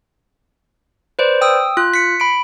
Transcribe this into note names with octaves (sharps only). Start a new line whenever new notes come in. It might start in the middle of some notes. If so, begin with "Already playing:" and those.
B4 C5 D5
G5 D#6 E6
F4 F#6
B6 C#7
B5 D7